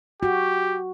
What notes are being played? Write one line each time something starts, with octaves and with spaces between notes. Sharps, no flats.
F#4 G4